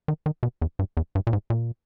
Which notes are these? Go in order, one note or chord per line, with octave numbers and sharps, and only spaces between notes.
D#3
D#3
B2
E2
G2
E2
G2
A#2
G#2
A#2